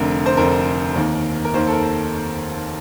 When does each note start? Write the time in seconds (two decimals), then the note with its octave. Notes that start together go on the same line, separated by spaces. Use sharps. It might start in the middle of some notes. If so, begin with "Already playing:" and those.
Already playing: F1 F2 D3 A#4
0.26 C5
0.37 F1 F2 D3 A#4
0.96 D#2 D#3
1.45 A#4
1.54 D#2 D#3 C5
1.67 A4
1.73 A#4